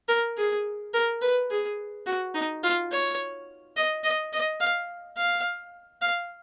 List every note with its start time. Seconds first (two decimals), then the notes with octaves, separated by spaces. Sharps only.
0.09 A#4
0.37 G#4
0.94 A#4
1.22 B4
1.51 G#4
2.06 F#4
2.35 D#4
2.63 F4
2.91 C#5
3.76 D#5
4.04 D#5
4.33 D#5
4.60 F5
5.17 F5
6.02 F5